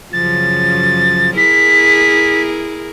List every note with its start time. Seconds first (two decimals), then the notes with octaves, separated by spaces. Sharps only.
0.13 F#2 C#3 F3 A6
1.37 E4 G#4 A#4 B6